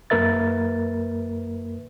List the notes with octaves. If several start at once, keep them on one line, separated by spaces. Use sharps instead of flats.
F#2 A#3 A#4 B4 E5 A6